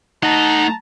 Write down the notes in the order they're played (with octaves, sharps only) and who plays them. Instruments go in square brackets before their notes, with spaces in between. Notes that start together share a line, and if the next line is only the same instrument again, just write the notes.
[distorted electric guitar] A3 F#5 [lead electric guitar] D#4 [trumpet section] A5 A#5